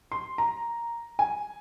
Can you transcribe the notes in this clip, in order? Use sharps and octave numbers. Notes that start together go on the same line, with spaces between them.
C6
A#5
G#5